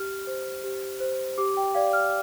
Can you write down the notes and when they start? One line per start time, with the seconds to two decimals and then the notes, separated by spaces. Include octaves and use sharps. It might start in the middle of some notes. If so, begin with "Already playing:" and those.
Already playing: G4 F6
0.27 C5
0.64 G4
1.00 C5
1.38 G4 D6
1.57 G5
1.75 D5 F5
1.93 F6